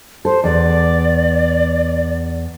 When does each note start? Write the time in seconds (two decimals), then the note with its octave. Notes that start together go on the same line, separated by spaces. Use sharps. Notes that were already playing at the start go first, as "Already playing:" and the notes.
0.25 A4 C5
0.44 E2 D5